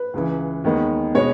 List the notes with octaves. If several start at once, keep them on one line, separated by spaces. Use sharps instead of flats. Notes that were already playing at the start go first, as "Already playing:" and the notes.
Already playing: B4
C#2 C#3 E3
D#2 D#3 G#3 B3
B2 G#3 B3 C#5